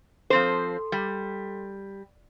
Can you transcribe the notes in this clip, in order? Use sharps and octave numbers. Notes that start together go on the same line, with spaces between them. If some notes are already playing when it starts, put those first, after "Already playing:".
F3 C4 A4 C5 C6
G3